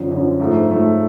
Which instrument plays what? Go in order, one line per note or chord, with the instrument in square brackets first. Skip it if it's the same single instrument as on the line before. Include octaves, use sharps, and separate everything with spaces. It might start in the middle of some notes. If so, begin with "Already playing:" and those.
Already playing: [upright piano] F#2 D3 F3
F#2 D3 F3
G#2 F3 A3
G#2 F3 A3